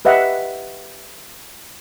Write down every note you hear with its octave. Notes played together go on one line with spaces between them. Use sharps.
G4 B4 D#5 E5 F#5